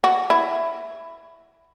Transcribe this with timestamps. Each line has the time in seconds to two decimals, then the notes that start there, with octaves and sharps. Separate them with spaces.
0.04 F#4
0.30 E4